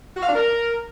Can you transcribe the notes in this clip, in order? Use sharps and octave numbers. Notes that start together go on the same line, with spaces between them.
F#4
F5
D4
A#4